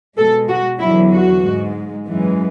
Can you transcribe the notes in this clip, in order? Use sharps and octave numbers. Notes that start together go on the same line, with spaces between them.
B2 G#3 A4
F#4
E2 D3 F#3 E4
F#4
G#2 G#3
F#2 E3 G#3